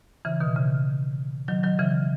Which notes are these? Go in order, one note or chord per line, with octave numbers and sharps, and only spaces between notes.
C#3 E3
B2 D#3
C#3
D#3 F#3
D#3 F#3
C#3 E3